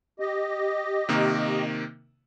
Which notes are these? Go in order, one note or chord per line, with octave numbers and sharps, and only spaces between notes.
G4 D#5
C3 D#3 A#3